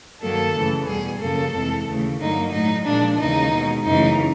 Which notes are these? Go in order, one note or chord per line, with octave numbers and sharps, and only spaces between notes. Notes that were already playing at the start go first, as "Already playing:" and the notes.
G2 D#3 F#3 A#3 A4
F#2 C#3 E3 A3
E2 B2 G3 G#4
F#2 C#3 F3 A#3 A4
F2 C3 E3 G#3
D#2 C#3 E3 A3
G2 D3 F#3 A#3 D#4
A2 F#3 A3 D#4
A#2 F3 G#3 D4
D#2 C#3 E3 G#3 D#4
B2 G#3
F#2 C#3 E3 A3 D#4